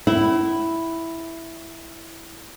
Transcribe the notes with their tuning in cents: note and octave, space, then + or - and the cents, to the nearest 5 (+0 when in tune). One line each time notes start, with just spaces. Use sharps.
E4 +0 F#5 +40